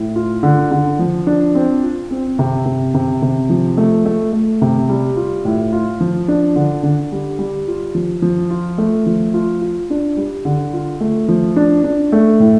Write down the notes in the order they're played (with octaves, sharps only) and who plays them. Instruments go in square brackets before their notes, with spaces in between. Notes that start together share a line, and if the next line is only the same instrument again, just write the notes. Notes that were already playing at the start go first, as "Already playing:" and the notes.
Already playing: [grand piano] A2
F4
D3
D3
F3
D4
C4
F4
C4
C3
C3
C3
C3
F3
A3
A3
A3
C3
G3
F4
A2
F4
F3
D4
D3
D3
G3
G3
F4
F3
F3
F4
A3
F3
F4
F4
D4
G3
D3
F4
A3
F3
D4
D4
A3
A2